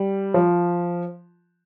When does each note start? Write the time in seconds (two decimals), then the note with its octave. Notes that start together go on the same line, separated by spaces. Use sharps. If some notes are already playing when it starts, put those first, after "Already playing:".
Already playing: G3
0.34 F3